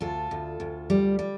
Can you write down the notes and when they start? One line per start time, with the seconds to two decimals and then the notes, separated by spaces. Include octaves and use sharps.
0.01 D2 F4 A4
0.31 D2
0.60 D2
0.90 G3
1.19 G3